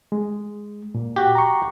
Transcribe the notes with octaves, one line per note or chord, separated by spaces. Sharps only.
G#3
A#2
F#4 G4
A#5 C#6